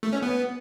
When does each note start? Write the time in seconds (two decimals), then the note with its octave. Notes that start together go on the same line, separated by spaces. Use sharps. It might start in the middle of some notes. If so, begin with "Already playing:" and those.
0.03 A3
0.13 C#4
0.22 B3